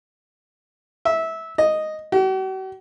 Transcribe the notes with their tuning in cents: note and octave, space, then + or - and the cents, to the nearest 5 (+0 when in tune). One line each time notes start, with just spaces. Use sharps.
E5 -20
D#5 -5
F#4 +45